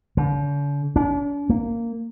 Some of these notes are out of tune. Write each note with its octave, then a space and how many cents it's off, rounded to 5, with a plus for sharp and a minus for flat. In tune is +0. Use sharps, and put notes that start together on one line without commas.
D3 -45
D4 -45
A#3 -10